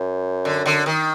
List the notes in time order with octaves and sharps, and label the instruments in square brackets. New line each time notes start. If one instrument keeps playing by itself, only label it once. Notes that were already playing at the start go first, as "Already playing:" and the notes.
Already playing: [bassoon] F#2
[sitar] D3
D3
D#3